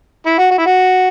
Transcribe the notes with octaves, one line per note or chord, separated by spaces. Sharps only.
E4
F#4
F#4
E4
F#4